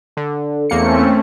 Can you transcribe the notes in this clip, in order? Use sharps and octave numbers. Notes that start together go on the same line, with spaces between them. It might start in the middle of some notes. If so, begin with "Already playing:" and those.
D3
E2 A3 A#3 C4 C#4 C#7